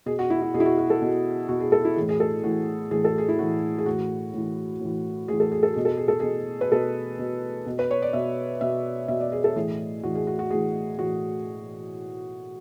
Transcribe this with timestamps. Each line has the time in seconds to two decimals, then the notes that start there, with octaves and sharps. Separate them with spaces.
0.06 B2 G#4
0.19 F#4
0.30 E4
0.42 E4
0.54 B2 G#4
0.60 E4
0.66 F#4
0.78 F#4
0.90 A4
1.02 B2
1.49 B2 F#4
1.60 G#4
1.72 A4
1.85 E4
1.96 A2 E3 G#4
2.09 G#4
2.20 A4
2.44 A2 E3 F#4
2.91 A2 E3 G#4
3.05 A4
3.18 G#4
3.28 E4
3.39 A2 E3 F#4
3.78 G#4
3.86 A2 E3 F#4
4.34 A2 E3
4.81 A2 E3
5.28 A2 E3 G#4
5.40 A4
5.51 G#4
5.63 A4
5.74 B2 G#4
5.85 A4
5.97 G#4
6.08 A4
6.20 B2 G#4
6.61 B4
6.72 B2 A4
7.19 B2
7.66 B2
7.79 B4
7.91 C#5
8.02 D5
8.13 B2 E5
8.61 B2 E5
9.08 B2 E5
9.20 D5
9.32 G#4
9.44 A4
9.56 A2 E3 G#4
10.03 A2 E3 F#4
10.15 G#4
10.27 F#4
10.39 F#4
10.51 A2 E3 G#4
10.98 A2 F#4
11.02 E3